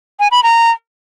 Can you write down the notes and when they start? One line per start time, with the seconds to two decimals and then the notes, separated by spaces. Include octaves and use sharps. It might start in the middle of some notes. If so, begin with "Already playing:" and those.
0.20 G#5
0.31 B5
0.43 A#5